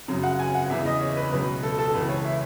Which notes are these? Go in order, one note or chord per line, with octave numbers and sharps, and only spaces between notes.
F#2 C#3 F#3
F#5
G#5
F#5
E2 C#3 E3 E5
D#5
C#5
B4
C#2 B2 F#3 B4
A4
A4
C#2 C#3 E3 B4
C#5
E5